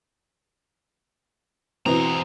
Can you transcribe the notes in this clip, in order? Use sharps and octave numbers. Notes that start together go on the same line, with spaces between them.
E2 B2 E3 C4 A#5